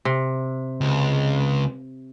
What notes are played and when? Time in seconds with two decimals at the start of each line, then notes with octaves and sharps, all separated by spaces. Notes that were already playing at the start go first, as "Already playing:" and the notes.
0.05 C3
0.81 C#2